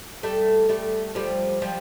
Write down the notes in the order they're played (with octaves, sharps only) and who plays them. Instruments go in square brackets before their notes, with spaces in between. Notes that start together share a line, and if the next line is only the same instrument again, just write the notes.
[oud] G3 A3
G3 A3
F3 G3
F3 G3